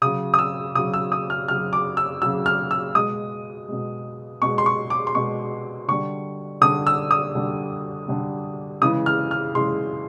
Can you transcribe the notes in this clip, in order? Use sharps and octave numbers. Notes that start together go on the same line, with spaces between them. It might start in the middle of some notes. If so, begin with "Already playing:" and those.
C#3 F#3 D#6
D#6
E6
C#3 F#3 D#6
E6
D#6
F6
C#3 F#3 F6
D6
E6
C#3 F#3 E6
F6
E6
B2 G#3 D#6
B2 G#3
B2 G#3 C#6
C6
C#6
D6
C6
B2 G#3 C#6
D3 G3 C#6
D3 G3 D#6
E6
D#6
D3 G3
D3 G3
C#3 E3 G#3 D#6
F6
F6
C#3 E3 G#3 C6